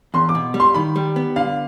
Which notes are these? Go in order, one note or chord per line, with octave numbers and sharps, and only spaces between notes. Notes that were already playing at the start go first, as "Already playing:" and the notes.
E2 C6
D6
B2
G3
C6
D#3 B5
G3
B3
D3 F5